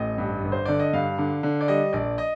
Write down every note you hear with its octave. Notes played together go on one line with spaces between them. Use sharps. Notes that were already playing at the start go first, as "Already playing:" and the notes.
Already playing: A1 A2 D#5
G2
G1
C5
D3 D5
D#5
G2 F5
D3
D3
D5
G3 D#5
A#1 D5
D#5